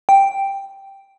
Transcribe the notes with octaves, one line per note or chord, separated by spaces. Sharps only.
G5